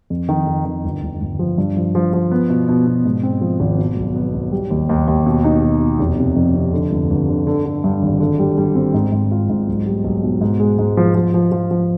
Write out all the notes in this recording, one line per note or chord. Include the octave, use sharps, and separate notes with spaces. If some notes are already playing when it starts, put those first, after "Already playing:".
F2
D#3
F2
D#3
G1
G1
G1
F3
G2
F3
F3
F3
B3
B2
B2
B2
G#2
C4
F3
G#1
B2
B1
B3
B1
G3
D#2
D#2
D#2
B2
D#4
B2
B2
F1
C3
F2
C3
D3
G1
G1
D3
D3
D3
G2
G#1
D3
G3
G3
C4
G#2
G#2
F4
G#2
B1
G3
B1
B2
G#2
G#3
G#2
F3
F3
F3
F3
F3